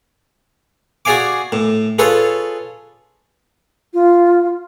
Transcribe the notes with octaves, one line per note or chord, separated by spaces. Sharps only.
F#4 G#4 D5 F5 G#5 D6
A2
F4 G#4 A4 B4 C#5
F4